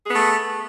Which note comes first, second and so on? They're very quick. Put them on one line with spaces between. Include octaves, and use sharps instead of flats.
G#4 B3 A3